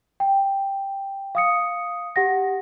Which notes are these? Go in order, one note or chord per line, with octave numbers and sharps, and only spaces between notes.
G5
F5 D#6 C#7
G4 F#5 A#6